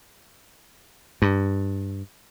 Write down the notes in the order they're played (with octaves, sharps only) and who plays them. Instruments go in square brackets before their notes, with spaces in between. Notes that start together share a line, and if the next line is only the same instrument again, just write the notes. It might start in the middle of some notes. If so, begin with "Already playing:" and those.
[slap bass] G2